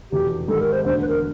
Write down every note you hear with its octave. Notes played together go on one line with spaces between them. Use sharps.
F1 E2 B2 G4
G#1 G#2 D#3 G3 A4
A#4
C5
E1 D2 D3 C5
B4
A#4